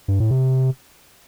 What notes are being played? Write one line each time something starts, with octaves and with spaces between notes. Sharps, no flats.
G2
A2
C3